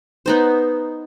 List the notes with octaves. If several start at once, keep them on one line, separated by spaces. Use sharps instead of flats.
B3 D#4 C5